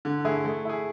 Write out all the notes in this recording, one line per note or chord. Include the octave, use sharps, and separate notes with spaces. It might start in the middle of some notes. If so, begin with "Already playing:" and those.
D3
A3 E4 G#4
A3
E4 G#4